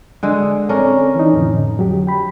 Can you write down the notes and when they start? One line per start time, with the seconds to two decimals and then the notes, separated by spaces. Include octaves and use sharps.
0.23 D3 G#3
0.69 C4 C#4 A4 A#4 D5
1.15 E3 D#4
1.33 F2 A2 D3
1.79 F#3 G4
2.07 G5 B5